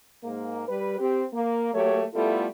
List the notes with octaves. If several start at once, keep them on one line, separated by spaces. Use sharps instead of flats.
G#2 A#3
G3 B4
C4 G4
A#3
F#3 A3 A#3 G4 C#5
G3 A3 B3 E4 F4 A4